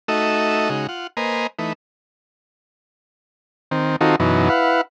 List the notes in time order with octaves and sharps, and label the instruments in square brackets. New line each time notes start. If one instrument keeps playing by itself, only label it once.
[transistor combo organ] A3 D#4 F#4 A4 D#5 E5
C#3 G#3 D#4 F#4
F4 F#5
A#3 B4 C5 D#5 G#5 A#5
E3 A3 D#4 B4
D#3 C4
D#3 C4 D#4 F4 F#4 A4
F#2 B2 E3 D#4
E4 B4 F5 F#5